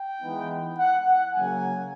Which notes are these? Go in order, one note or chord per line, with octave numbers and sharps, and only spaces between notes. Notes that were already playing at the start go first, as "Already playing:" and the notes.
Already playing: G5
E3 G#3 B3 D#4
F#5
F#5
C#3 F#3 A#3 G#5